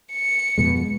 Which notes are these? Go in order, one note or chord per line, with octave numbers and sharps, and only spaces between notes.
C#7
F2 B2 G#3